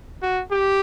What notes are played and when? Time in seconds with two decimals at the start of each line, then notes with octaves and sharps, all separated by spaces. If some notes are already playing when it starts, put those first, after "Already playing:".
0.22 F#4
0.51 G4